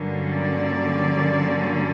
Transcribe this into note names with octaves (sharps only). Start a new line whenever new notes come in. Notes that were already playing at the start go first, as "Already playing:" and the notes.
Already playing: G2 D3 F#3 A#3 C#4
D5